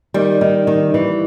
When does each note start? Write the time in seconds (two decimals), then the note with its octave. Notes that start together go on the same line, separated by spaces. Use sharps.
0.14 D#3 G3
0.41 D#3
0.67 D#3
0.94 E3